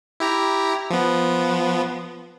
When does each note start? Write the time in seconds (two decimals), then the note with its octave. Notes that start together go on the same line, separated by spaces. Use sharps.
0.20 E4 G4 A#5
0.90 F3 B3